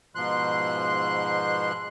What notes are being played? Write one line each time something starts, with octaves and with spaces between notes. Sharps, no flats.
G#2 B2 F3 C6 F#6